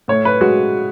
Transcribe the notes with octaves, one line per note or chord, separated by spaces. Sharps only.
A2 C#5
B4
G#3 F#4